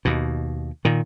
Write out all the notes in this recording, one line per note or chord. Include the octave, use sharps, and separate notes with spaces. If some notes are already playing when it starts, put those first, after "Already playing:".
D#2 B2
A#2 D#3